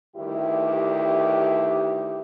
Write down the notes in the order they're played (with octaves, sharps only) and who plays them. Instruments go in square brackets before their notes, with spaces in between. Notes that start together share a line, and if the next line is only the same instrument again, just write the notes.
[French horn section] D2 G2 D#3 E4 G4